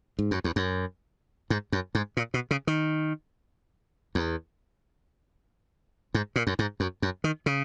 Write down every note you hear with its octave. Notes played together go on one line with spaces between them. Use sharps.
G#2
F#2
E2
F#2
G#2
F#2
G#2
A#2
B2
C#3
D#3
E2
G#2
A#2
F#2
G#2
F#2
F#2
D#3
C#3